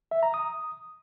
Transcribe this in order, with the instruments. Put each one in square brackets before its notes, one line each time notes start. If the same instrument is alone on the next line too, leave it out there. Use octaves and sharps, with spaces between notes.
[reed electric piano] E5
A#5
D#6